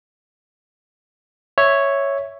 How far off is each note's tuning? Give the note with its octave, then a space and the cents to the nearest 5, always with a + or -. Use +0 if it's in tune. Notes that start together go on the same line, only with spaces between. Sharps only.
C#5 +0 E5 +0